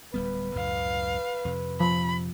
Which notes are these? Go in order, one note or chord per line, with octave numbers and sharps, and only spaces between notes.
D1 G3 B3 B4
C#2 F#2 A2 F5
F2 C3
F3 B5